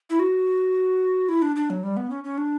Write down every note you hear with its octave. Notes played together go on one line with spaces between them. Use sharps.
E4
F#4
E4
D4
D4
F#3
G3
B3
C#4
C#4
D4